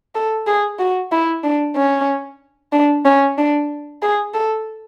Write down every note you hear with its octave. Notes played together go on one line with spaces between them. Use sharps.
A4
G#4
F#4
E4
D4
C#4
D4
C#4
D4
G#4
A4